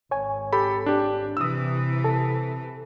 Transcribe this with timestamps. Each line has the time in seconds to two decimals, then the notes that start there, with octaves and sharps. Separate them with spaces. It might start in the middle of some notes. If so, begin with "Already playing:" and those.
0.11 G#1 C#5 G#5
0.53 G4 A4 B5
0.86 D4 G4
1.37 C3 E3 D#6 E6
2.05 A4